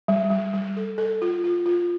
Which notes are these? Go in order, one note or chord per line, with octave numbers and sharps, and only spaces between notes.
G3
G3
G3
A4
A4
F4
F4
F4